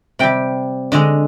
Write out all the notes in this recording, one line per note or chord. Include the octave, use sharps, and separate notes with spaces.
C3 G3 G5
D3 G#3 D#5